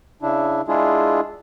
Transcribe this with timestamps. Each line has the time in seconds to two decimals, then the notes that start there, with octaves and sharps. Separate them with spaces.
0.22 C#3 D4 E4
0.68 G#3 D4 E4 F4 G#4